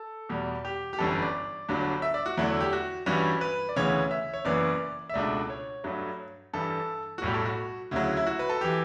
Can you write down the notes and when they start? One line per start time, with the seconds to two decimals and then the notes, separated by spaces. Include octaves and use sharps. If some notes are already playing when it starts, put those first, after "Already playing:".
Already playing: A4
0.29 E2 B2 G3
0.65 G4
0.93 G4
0.99 G1 F#2 E3 G3 D4 A4
1.11 B4
1.22 D5
1.69 G1 G2 D3 F#3
2.02 E5
2.14 D5
2.26 F#4
2.37 E2 D3 F#3 A3 D4 E4
2.60 G4
2.73 F#4
3.06 G2 E3 G3 C#4 F#4
3.41 B4
3.69 D5
3.76 D2 C#3 E3 B3 C#5
4.11 E5
4.34 C#5
4.45 F#1 F#2 E3 B3 D5
5.09 E5
5.14 C#2 B2 A3 D4 D5
5.50 C#5
5.84 G2 F#3 A3
6.53 G2 E3 G3 A4
7.18 F#4
7.22 B1 A2 G3 G4
7.34 A4
7.45 F#4
7.91 D2 C#3 F#3 E4
8.17 E4
8.27 F#4
8.39 B4
8.49 A4
8.61 E3 G4